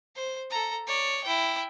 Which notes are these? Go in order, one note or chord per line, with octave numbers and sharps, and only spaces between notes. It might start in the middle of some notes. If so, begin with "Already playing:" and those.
C5
A4 A#5
C#5 D5
E4 G5